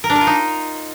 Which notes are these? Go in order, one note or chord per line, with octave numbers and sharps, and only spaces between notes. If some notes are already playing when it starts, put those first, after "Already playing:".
A#4
D4
A#4
F4
D#4